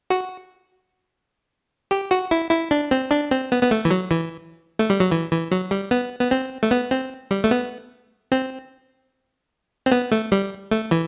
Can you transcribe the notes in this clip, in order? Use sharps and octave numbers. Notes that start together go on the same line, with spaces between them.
F#4
G4
F#4
E4
E4
D4
C4
D4
C4
B3
B3
A3
E3
F#3
E3
A3
G3
F#3
E3
E3
F#3
G3
B3
B3
C4
A3
B3
C4
G3
A3
B3
C4
C4
B3
A3
G3
A3
E3